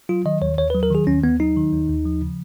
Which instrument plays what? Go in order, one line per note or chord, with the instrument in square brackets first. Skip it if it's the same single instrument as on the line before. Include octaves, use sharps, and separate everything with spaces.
[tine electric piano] F#3 F4
D#3 D#5
D#2 C#5
D#2 C#5
B4
F#3
A#4
D#3 G#4
D#2 C#4
D#2 B3
F#3 D#4
D#3
D#2
D#2
F3
C#3